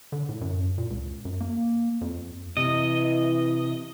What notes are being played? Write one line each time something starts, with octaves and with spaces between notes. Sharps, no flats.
D3
A2
F#2
A#2
C#2
F#2
A#3
F2
C3 E3 D#5